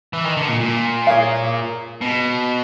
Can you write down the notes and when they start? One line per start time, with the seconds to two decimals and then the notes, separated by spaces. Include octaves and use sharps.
0.13 E3
0.25 D#3
0.37 D3
0.49 A#2
0.61 A#2
1.07 G#4 C#5 F5
2.01 B2